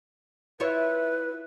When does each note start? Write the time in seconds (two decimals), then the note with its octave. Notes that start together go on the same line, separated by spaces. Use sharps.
0.60 E4 F4 B4 C#5